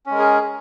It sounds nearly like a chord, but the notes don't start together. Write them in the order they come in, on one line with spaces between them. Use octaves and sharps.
C#4 G#3 A#4 G#4